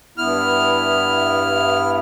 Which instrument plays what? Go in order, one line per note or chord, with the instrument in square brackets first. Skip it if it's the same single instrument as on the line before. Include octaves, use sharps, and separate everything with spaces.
[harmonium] G2 B3 E4 [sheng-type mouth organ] F6